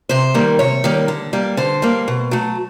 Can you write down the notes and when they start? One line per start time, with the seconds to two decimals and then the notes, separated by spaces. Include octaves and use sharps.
0.09 C3 C5
0.34 D#3 G3 A#3
0.59 C3 C#5
0.84 D#3 G3 A#3
1.08 D3
1.33 G3 A#3
1.57 D3 C5
1.82 G3 A#3
2.08 B2
2.31 F#3 A3